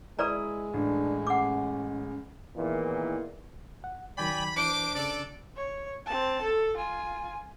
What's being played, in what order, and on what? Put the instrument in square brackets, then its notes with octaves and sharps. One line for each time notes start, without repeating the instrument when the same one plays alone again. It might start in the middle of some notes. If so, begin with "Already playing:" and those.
[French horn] G#3 [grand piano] E4 D#6 [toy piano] B4 D5 A#5
[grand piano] A1 [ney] D4
[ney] C#4 [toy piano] F#5 D6
[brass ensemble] E2 A#2 D#3 E3
[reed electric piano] F#5
[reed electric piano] C#2 D#3 F#3 [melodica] D5 G5 G#5 [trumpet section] B5
[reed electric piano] E3 [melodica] D4 [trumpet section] C5 D6 [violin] D7
[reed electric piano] C#3 [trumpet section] A4 D5
[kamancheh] C#5
C4 A5
A4
F4 G#5